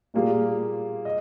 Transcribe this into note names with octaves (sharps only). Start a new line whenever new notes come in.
A#2 G3 A#3 F4 G#4
D#5